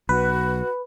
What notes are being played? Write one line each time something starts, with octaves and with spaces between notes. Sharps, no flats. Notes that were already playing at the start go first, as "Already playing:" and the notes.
B1 F#4 B4